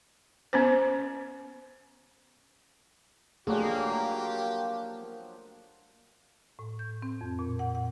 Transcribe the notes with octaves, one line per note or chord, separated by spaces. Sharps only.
B3 C#4 C5
F3 F#3 A3 A#3 D4 G4 G#4
A2
G6
C4
F2
A#2
F#5
F#5